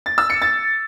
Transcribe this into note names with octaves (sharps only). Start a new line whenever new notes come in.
A6
E6
C#7
A6